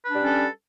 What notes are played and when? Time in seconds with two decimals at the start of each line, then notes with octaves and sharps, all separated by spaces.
0.04 B4
0.09 D4
0.14 G3
0.19 C#4
0.24 A4